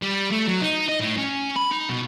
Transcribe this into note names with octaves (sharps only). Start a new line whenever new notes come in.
G3
A3
F#3
D#4
D#5
A2
C#4
B5
D#4
B2